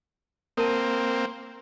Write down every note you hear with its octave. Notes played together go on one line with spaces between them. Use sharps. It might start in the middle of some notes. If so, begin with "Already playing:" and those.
A#3 C4 A#4 A5